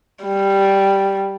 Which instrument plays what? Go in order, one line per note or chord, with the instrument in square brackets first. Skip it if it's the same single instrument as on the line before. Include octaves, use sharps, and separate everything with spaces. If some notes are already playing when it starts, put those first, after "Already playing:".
[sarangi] G3